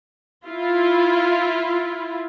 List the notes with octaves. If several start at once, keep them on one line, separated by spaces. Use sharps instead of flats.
E4 F4